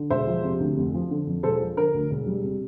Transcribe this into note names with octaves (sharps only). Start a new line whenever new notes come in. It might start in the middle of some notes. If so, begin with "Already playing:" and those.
Already playing: D3
E1 C5 E5
F3
C3
D2
F1
F3
D3
F2
E1 A4 C5
F3
D3 A#4
D2
E1
G3
C3